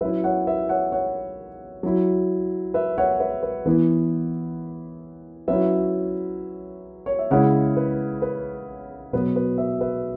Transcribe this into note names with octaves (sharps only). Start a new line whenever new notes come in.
F#3 C#4 E4 B4 E5
C#5 F#5
B4 E5
C#5 F#5
C#5 F#5
F#3 E4
B4 E5
C#5 F#5
B4 E5
B4
E3 B3 E4 B4
F#3 C#4 E4 B4 E5
C#5
E5
C#3 G#3 C#4 E4 C#5 F#5
B4
B4
B2 F#3 B3 B4
B4
B4 E5
B4 E5